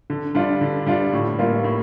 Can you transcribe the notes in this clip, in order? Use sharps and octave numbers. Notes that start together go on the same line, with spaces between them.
D3
G3 D4 F4
D3
G3 D4 F4
A2
G3 A#3 F4
A2